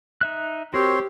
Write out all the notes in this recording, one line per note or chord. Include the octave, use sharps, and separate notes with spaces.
D#4 E5 F#6
C4 F#4 G4 A#4 C#5 C6